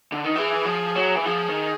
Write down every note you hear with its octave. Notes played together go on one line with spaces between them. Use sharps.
D3
D#3
E3 G#4
F3
F#3
E3
F3 G#4
D#3